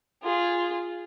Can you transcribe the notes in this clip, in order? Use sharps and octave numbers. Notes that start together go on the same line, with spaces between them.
F4 G#4